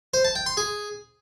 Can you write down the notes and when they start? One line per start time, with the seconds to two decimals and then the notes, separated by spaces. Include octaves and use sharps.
0.14 C5
0.25 A5
0.35 G5
0.46 C6
0.57 G#4